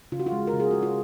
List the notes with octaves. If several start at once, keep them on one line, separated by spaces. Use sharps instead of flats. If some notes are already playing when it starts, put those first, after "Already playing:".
C#3 F4
F#4
F4
G#3
A#4
C#3
G#4
C#4 F#4
F4